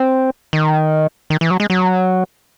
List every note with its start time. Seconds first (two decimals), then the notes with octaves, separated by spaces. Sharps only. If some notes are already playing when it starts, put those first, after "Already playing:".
Already playing: C4
0.53 D#3
1.30 D#3
1.41 E3
1.51 F#3
1.60 G#3
1.70 F#3